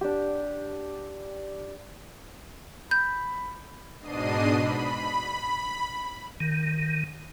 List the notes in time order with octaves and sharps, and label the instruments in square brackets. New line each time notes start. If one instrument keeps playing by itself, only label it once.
[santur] D4 G4
[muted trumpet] B5 [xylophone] G6
[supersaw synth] G#2 B2 D4 D#5 C7 D#7
B5
[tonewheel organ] D#3